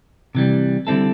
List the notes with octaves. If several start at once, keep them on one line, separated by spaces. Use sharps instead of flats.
C3 E3 G3
D3 G3 C4 E4 A4